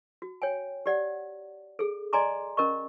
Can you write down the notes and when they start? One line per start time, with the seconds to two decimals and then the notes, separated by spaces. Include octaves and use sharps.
0.22 F#4
0.42 C#5 G5 G#5
0.86 G4 D5 F#5
1.79 G#4 A4
2.13 D5 D#5 G#5 A#5 C6 D6
2.57 C#4 A#4 D#5 C#6